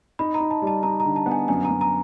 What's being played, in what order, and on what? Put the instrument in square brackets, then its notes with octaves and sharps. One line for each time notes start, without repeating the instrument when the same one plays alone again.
[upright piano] D#4 [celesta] B5
[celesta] A#5
[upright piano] D#4
[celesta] A5
[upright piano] G3
[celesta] A5
[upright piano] D#4 [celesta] A#5
[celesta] A#5
[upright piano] D3
[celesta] A5
[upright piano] B3
[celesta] G#5
[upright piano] F#2 [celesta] G#5
[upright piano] F#2 [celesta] A#5
[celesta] A#5